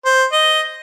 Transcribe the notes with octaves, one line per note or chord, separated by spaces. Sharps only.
C5
D#5